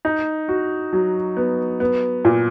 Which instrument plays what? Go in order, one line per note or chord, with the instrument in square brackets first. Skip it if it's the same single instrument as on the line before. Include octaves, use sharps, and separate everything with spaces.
[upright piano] D#4
F#4
F#3
B3
B3
A#2